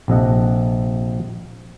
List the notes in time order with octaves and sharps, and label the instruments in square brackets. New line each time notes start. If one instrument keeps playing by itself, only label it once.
[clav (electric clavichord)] A#1 C3 A4 D#5 F#5